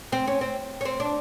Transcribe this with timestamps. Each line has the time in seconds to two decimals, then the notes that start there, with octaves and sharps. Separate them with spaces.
0.12 C4
0.28 C#4
0.41 C4
0.81 C#4
0.85 C4
1.00 D4